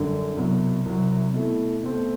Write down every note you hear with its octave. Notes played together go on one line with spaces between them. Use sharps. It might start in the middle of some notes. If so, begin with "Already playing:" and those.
Already playing: F#2 D3 G3 D4
C2 B2 F#3
C2 C3 F#3
B2 A3 E4
B2 A3 C4